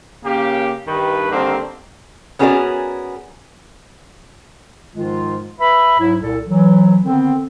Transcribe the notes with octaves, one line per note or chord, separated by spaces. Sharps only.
C#3 A#3 G4
G2 D#3 B4
D3 D#3 G3 A#3 C4
B3 C#4 F#4 G#4 A#4 D5
G#2 D#3 F3 G#3 F4
B4 E5 B5
G#2 F#3 E4
C2 A#2 A4
E3 F#3
D3 D#3 B3 C4